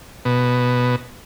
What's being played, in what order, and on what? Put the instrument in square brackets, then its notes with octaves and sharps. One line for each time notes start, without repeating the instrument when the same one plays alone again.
[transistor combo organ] B2